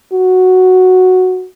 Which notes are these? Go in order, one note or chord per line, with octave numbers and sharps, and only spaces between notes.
F#4